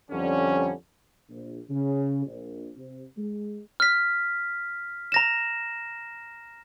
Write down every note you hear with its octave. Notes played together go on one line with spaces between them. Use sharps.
F2 D3 G3 C#4
A#1
C#3
A#1
C3
G#3
F6 B6
A#5 A#6 E7